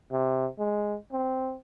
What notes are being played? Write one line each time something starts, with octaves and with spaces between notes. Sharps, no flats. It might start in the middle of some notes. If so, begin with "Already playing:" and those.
C3
G#3
C4